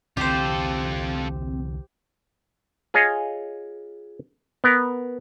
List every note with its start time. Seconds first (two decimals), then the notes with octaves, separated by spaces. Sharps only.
0.17 C2 D3 E3 C4 F4 G4 A4 C5
2.94 F4 G#4 C#5 D#5
4.64 B3 A#4